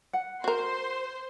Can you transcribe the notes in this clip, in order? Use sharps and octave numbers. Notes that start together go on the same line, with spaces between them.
F#5
F#4 A#4 C5 C6